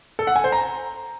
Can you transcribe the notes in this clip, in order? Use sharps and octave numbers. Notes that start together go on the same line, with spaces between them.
A4
F#5
G#5
C5
A#5